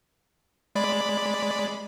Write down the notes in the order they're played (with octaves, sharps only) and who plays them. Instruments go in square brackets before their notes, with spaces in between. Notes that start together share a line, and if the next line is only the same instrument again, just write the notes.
[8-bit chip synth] G#3 D5 B5